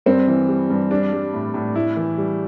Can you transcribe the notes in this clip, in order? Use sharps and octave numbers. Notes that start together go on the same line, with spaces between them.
G2 C4
E3
G3
G2
G3 D4
G3
A2
A2
A2 E4
E3
G3